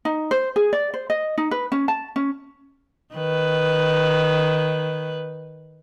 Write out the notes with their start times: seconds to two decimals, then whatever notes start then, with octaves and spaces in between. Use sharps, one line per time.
0.05 D#4
0.31 C5
0.56 G#4
0.73 D5
0.94 C5
1.10 D#5
1.38 D#4
1.51 B4
1.72 C#4
1.88 A5
2.16 C#4
3.14 D#3 B4